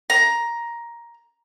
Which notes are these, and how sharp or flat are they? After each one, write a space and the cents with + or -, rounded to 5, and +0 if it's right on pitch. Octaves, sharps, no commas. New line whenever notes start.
A#5 +10